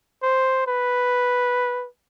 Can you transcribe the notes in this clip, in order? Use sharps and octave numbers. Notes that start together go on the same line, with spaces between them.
C5
B4